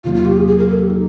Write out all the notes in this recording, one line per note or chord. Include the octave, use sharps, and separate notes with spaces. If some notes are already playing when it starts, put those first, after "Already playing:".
E2 C3 D#3 F#3 A#3 F4
F4
G4
G#4
G#4
A#4
A4
G4
D#4